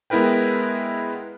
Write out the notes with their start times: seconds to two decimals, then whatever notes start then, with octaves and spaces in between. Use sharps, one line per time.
0.10 G#3 B3 E4 A#4 B4 G5